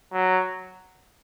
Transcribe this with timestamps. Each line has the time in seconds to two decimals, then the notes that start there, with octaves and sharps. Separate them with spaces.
0.12 F#3